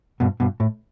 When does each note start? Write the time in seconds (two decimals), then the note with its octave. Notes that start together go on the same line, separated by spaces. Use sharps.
0.20 G2 B2
0.40 G2 B2
0.60 A2